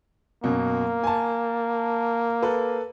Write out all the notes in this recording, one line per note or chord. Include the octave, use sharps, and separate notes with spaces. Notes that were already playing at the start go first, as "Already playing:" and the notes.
F#2 B2 A#3
G#5 A5
A4 B4